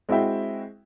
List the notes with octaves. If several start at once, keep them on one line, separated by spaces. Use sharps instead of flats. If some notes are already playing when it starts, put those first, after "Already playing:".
G#3 C4 E4 F#4 E5 G5